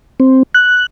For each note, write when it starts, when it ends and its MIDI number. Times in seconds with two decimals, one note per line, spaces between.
0.20 0.43 60
0.55 0.86 90